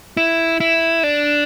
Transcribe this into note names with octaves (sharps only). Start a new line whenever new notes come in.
E4
E4
D4